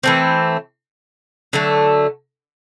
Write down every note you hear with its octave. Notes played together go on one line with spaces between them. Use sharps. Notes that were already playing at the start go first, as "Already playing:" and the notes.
E3 A3 C4
D3 F#3 A3